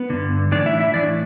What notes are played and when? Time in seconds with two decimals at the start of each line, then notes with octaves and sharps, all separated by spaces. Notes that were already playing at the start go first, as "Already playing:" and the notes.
Already playing: B3 B4
0.10 G2 D3
0.51 A2 E3 D4 D5
0.66 E4 E5
0.80 E4 E5
0.94 A2 E3 D4 D5